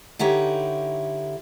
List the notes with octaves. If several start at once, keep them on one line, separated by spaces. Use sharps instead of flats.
D3 D#4 E4 G4 C#5